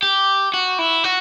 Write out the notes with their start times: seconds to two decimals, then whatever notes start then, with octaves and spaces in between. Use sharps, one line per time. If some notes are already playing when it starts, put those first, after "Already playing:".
0.03 G4
0.54 F#4
0.79 E4
1.04 F#4